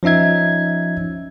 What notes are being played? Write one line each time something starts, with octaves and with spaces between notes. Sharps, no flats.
F3 C#4 D#4 E5 G#6